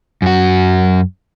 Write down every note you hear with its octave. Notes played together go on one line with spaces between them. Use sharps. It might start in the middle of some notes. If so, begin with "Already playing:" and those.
F#2 F#4